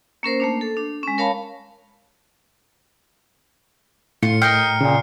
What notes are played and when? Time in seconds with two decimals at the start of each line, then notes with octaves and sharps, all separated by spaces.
0.23 A#3 C#4 A#4 C5
0.40 A3 A#3 D4
0.61 A4
0.77 D4
1.03 G#3 C#4
1.18 A#4 C#5 F5 A5 B5
4.23 A2 F4 C#7
4.42 A#4 D#5 G5 F6 C7 C#7
4.81 A#2 C#3